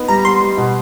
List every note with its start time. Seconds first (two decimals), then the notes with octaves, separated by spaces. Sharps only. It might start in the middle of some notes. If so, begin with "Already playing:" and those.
Already playing: B3 D#4
0.08 G3 A#5
0.25 B3 C6
0.41 G3
0.57 B2